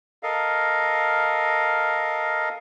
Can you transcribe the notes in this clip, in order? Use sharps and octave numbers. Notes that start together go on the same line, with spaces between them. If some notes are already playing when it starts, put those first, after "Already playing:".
A4 A#4 D#5 F5